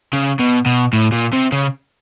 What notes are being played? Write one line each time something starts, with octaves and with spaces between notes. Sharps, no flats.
C#3
B2
B2
A2
A#2
C3
C#3